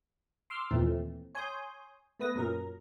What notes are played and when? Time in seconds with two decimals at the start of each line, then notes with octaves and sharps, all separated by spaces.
0.50 C6 D6 E6 F6
0.71 D#2 A#2 E3 A3 C4
1.35 C#5 G#5 C6 D#6 G6
2.19 A3 B3 B4 D#6 A#6
2.35 F#2 A#2 F#3 A#4 A#5